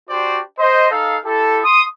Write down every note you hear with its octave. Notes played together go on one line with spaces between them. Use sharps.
D4 F#4 G4 C5 D5
C5 D#5
D#4 A4 F5
E4 G4 A4
C6 D#6